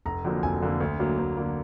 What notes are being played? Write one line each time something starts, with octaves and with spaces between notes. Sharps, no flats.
F1 A#5
F2 D3 F#3 A#3
F1 G#5
F2 D3 F#3 A#3
D2
D3 F#3 A#3
D2
D3 F#3 A#3